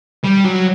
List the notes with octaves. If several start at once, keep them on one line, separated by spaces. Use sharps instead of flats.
G3
F#3